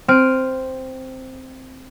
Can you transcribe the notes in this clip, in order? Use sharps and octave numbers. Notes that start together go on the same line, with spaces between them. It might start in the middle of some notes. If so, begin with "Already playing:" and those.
C4 F6 D7 D#7